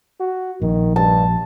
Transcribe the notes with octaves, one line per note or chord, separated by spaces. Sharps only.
F#4
A#1 D#3
G2 A5